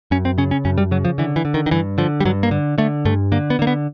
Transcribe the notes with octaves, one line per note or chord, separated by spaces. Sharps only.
F#2 C#4
C4
C#3 C#4
C#4
F#2 C#4
G3
C#3 F#3
F3
D3 E3
E3
D3
D#3
D#3
G2 E3
D3 F3
G3
G2 F#3
A#3
D3
D3 A3
G2 A3
D3 A#3
B3
D3 A#3
B3